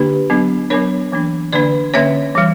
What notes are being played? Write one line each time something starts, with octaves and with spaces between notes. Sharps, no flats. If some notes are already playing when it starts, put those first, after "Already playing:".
Already playing: D3 A#3 D4 G4 B4
F#3 B3 D4
F#3 B3 D4 A#4 C#5
E3 A#3 D4
D3 A#3 D4 B4 D5
D3 A#3 C#4 C#5 E5
E3 G3